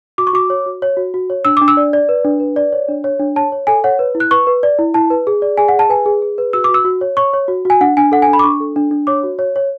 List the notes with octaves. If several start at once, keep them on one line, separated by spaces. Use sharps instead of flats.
F#4 D6
C#6
F#4 D6
C#5
F#4
C#5
F#4
F#4
C#5
D4 E6
D4 D6
E6
D5
D5
B4
D4
B4
D5
C#5
D4
C#5
D4
C#5 A5
C#5
A4 G#5
C#5 F#5
B4
E4
F#6
B4 C#6
B4
D5
E4
E4 A5
B4
G#4
D5
G#4 G#5
F#5
G#4
A5
B4 G#5
G#4
G#4
B4
F#4 E6
F#4 D6
E6
F#4
C#5
C#5 C#6
C#5
F#4
F#4 G#5
D4 F#5
D4 G#5
A4 F#5
G#5
D4
B5
D6
D4 C#6
A4
D4
D4
C#5 D6
F#4
C#5
C#5